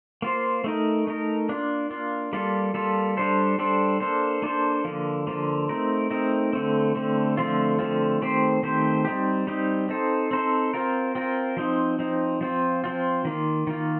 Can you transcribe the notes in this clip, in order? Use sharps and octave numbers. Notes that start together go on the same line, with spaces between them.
A#3 F4 C5
A3 D#4 A#4
A3 D#4 A#4
A#3 D4 F4
A#3 D4 F4
G3 A#3 F4 A4
G3 A#3 F4 A4
G3 D4 A4 C5
G3 D4 A4 C5
A#3 D4 A4 C5
A#3 D4 A4 C5
D3 F3 A#3
D3 F3 A#3
A3 C4 D#4 A#4
A3 C4 D#4 A#4
D3 A3 C4
D3 A3 C4
D3 F3 A3 C4 F4
D3 F3 A3 C4 F4
D#3 A3 C4 G4 C5
D#3 A3 C4 G4 C5
G3 C4 D#4 G4
G3 C4 D#4 G4
C4 D#4 A4 C5
C4 D#4 A4 C5
C4 F4 A#4
C4 F4 A#4
F3 C4 D#4
F3 C4 D#4
F3 C4 F4
F3 C4 F4
D#3 A#3 F4
D#3 A#3 F4